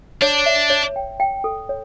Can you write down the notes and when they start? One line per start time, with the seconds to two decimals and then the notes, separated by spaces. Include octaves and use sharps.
0.22 D4 C#5
0.46 E5
0.70 C#5
0.96 G5
1.20 G5
1.44 A4
1.69 C#5